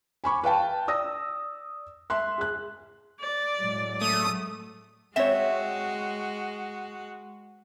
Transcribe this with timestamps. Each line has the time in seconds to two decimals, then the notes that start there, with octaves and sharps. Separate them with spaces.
0.24 G#5 B5 C#6 D6
0.44 B4 F5 G5 A5
0.88 D5 D#6 E6 A#6
2.10 E5 C6 F#6
2.38 G#4 F#6
3.20 D5
3.59 A2 F#3 G#3
4.01 A3 D#6
5.16 G#3 C4 F#4 C#5 E5 E7